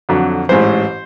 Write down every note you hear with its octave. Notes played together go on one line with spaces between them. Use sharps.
F2 D3 F#3
A1 G#2 E3 C5